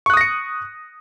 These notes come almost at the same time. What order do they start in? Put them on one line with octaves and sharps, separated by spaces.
C#6 F#6 D#6 A#6 C#7